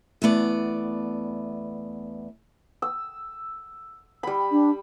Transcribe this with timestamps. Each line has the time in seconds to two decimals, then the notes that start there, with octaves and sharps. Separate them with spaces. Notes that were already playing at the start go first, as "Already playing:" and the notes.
0.22 E2 A3 B3 D5
2.82 E6
4.23 G3 B5
4.51 D4